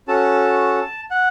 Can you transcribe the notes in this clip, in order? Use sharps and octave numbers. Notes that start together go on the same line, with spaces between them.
C#4 F#4 A4 A5
F#5